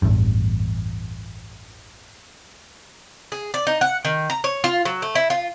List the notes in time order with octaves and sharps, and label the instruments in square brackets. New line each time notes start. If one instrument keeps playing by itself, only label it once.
[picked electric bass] A1 E2 G2
[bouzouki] G#4
D5
D#4
F#5
D#3
A#5
C#5
F4
F#3
A3
E4
F4